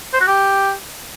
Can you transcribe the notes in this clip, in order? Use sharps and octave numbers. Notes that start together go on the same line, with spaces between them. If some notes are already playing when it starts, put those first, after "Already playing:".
C5
F#4
G4